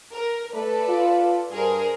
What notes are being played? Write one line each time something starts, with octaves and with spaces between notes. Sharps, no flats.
A#4
A3 A4 B4 D5
F4
G2 G#4 A#4 C5